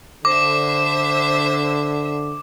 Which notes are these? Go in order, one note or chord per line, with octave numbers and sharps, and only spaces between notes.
D3 C5 E5 D6